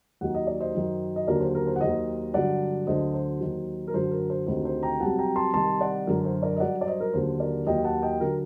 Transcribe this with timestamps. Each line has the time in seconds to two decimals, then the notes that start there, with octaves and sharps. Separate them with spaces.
0.21 D#2 D#3 F#3 F#5
0.35 D#5
0.47 D5
0.60 C5 D#5
0.74 F#2 D#3 F#3
1.16 D#5
1.28 D#2 D3 F#3 A#4 D5
1.41 C5
1.55 A#4
1.67 C5
1.76 F#5
1.81 D#2 D#3 F#3 C5 D#5
2.34 G2 D3 F#3 D5 F#5
2.87 D2 D3 F#3 C5 D#5
3.14 C5
3.40 D#2 D#3 F#3
3.88 A#4
3.94 F#2 D3 F#3 C5
4.11 A#4
4.30 C5
4.47 D2 C3 D#3 C5
4.65 C5
4.83 G5 A#5
5.00 C2 C3 F#3 F#5 A5
5.19 G5 A#5
5.36 A5 C6
5.54 C2 C3 D#3 A5 C6
5.81 D5 F#5
6.07 F#2 D3 F#3 A#4
6.25 C5
6.42 A#4 D5
6.56 D#5
6.60 G2 F#3 D5 F#5
6.81 D5
6.87 C5 D#5
7.00 A#4
7.14 D#2 D3 F#3 C5
7.40 A#4 D5
7.67 D#2 D#3 F#3 D#5 G5
7.84 F#5 A5
8.02 D#5 G5
8.20 D3 F#3 A#4